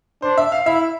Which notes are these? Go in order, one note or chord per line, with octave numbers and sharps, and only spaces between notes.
D4 C5
E5
F5
E4 E5